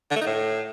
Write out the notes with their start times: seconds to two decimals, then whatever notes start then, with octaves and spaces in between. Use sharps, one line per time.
0.11 D3
0.16 A3
0.21 D#4
0.26 A2